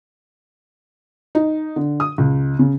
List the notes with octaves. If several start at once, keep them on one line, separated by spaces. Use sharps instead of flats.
D#4
D3
D#6
C#2
C#3